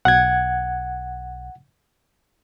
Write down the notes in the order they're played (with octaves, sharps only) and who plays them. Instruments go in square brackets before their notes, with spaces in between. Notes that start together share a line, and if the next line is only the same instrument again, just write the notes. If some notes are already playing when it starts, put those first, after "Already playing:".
[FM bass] B1 [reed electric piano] F#5 G#6